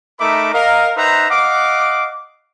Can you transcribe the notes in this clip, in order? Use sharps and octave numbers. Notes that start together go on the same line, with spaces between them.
A3 D#4 A#4 E5 B5 D6
A#4 D#5 F5
D#4 B4 C5 E5 F#5 A#5
D#5 F5 F#5 D6